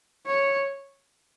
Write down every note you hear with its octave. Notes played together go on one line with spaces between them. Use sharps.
C#5